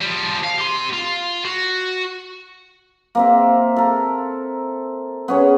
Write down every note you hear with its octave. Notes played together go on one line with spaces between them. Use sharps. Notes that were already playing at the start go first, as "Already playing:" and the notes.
F3 G3
F5
G4 C6
F4
F#4
A#3 C4 E5
A4 A#4
B3 C#4 G#4